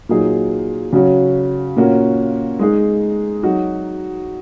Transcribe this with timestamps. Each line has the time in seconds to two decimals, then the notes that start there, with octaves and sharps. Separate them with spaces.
0.09 A#2 F#3 D#4 G#4
0.93 C#3 F#3 C#4 F#4
1.76 A#2 A#3 C#4 F#4
2.59 G#3 D#4 G#4
3.43 F#3 D#4 F#4